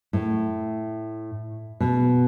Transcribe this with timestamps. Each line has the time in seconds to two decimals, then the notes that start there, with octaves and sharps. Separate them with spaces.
0.13 A2
1.80 B2